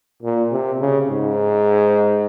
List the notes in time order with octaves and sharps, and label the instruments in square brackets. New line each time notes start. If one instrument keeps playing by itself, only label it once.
[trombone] A#2
C3
C#3
G#2